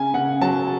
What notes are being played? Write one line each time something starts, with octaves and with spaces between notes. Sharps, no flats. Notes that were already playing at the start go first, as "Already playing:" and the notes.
Already playing: C#3 G#5
C#3 F#5
F#3 A5